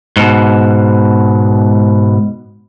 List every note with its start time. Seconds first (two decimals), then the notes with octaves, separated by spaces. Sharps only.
0.17 G#2 B2